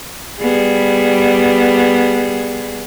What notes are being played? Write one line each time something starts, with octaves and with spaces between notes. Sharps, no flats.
G3 B3 G#4